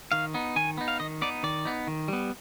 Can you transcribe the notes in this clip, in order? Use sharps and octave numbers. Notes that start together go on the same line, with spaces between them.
D#3 F5
B3 D#4
D#3 G#5
B3 D#4
F5
D#3 D#5
B3 D#4 D5
D#3 D5
B3 D#4
D#3
G3 B3